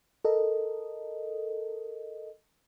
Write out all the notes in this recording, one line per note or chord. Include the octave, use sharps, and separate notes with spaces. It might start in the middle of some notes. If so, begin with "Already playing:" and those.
A4 A#4 D#5